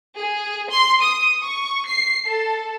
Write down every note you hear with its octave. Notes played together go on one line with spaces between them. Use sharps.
G#4
C6
D#6
C#6
C7
A4